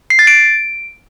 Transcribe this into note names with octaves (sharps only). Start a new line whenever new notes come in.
C7
A6
D7